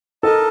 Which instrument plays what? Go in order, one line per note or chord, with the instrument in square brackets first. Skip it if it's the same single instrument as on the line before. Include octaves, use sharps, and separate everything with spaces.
[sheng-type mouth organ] D#4 A#4 D#5 A5 [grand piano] A4